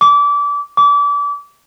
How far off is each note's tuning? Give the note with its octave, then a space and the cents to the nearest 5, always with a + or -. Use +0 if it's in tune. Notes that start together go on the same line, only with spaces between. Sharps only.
D6 -25
D6 -30